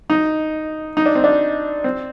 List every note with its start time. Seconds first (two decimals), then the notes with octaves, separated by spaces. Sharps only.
0.10 D#4
0.97 D#4
1.06 D4
1.15 C4
1.24 D4
1.84 C4